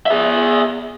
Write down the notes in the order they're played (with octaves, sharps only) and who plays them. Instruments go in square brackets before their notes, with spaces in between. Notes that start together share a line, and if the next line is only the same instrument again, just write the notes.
[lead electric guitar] G#4 E5